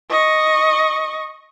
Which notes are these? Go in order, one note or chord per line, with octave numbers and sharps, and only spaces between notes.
D#5 C#6